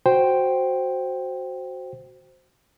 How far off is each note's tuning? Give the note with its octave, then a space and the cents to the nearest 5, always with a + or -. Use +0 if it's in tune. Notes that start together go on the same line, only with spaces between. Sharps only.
F#4 +0 C5 +0 G5 +0